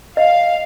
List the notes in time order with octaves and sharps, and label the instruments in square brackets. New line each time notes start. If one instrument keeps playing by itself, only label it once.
[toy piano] D#5 [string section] F5